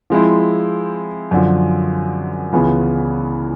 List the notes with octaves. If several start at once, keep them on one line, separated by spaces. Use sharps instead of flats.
F3 G#3 C4 E4
F#2 D3 F3
C#2 C#3 E3 G#3 B3